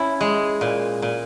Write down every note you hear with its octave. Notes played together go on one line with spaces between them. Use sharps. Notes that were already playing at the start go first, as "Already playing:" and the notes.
Already playing: C#4 E4
G#3
A#2
A#2